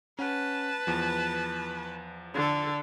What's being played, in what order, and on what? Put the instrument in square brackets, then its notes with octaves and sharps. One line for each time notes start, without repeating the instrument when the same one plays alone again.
[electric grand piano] C#4 F#5 [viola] B4 A5
[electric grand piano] E2 F3
[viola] D3 A4